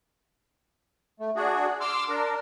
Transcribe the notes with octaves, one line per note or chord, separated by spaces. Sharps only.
A3
D4 F#4 G#4
C6 D6 E6 F6
D4 A#4